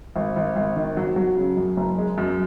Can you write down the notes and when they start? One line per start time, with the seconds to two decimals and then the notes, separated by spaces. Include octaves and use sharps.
0.16 G#1
0.36 G#1
0.56 G#1
0.76 D#3
0.97 F#3
1.16 F#3
1.36 C#3
1.57 F#2
1.77 F#1
1.98 G#3
2.18 F#2